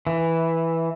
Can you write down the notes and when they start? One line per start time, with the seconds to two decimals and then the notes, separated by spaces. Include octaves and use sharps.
0.07 E3